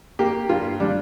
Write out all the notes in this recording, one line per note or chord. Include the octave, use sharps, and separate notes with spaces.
A#3 G4
G2 F4
G3 D4